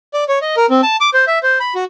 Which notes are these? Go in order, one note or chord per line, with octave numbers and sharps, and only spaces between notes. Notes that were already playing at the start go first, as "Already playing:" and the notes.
D5
C#5
D#5
A#4
C4
A5
D6
C5
E5
C5
B5
F#4